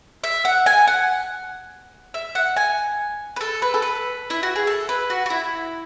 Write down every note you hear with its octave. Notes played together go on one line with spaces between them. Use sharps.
E5
F#5
G#5
F#5
E5
F#5
G#5
B4
A4
B4
A4
B4
E4
F#4
G#4
A4
B4
F#4
F#4
E4